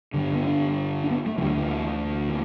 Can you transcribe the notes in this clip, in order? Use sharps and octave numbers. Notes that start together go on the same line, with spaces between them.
G1 G2 D3
B3
D4
D4
B3
A3
E3
D2 D3 G3
E3
E3